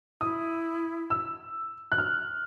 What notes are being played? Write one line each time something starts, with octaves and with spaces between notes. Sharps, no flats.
E4 D#6
E6
F#6
F6